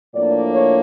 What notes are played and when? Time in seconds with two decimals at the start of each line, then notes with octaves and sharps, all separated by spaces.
0.13 A2 F3 A#3 D4 D5
0.52 C#5